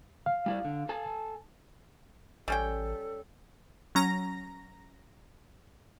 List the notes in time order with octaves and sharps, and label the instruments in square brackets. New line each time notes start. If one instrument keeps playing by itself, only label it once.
[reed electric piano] F5
[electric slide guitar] G3 E4 D5
D3
A4 G#5 A5
[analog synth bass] A1 [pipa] G3 C#4 G5 [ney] A4
[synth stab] F#3 C#4 A#5 A#6